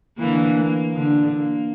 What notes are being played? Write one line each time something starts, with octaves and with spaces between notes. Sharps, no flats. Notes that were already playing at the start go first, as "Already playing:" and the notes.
D3 E3 A#3
A#3
D3
A#3